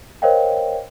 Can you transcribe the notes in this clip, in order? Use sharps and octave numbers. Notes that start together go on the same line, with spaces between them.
A#4 C5 C#5 D#5 F5 G5